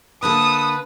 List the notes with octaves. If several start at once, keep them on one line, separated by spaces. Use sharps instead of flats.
D3 A#3 A4 B4 D#6